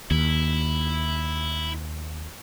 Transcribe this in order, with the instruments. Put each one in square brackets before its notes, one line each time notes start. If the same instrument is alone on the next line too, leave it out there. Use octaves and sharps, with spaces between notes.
[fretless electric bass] D#2 [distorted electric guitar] E4